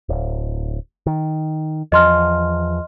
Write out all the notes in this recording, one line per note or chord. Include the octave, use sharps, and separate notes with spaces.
D1
D#3
E2 F3 D#5 C6 F6